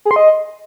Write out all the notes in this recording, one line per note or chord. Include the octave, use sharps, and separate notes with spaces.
G#4
C6
D#5